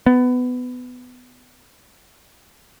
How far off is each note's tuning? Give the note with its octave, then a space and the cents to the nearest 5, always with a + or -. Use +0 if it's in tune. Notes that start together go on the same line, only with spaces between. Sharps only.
B3 +15